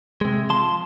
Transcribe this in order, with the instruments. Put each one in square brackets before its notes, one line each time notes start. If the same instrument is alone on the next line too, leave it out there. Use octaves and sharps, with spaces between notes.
[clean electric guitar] C3 G#3
F3 A5 C6